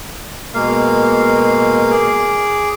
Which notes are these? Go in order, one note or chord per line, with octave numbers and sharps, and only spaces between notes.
B2 G#3 A#3 F5
G#4 D6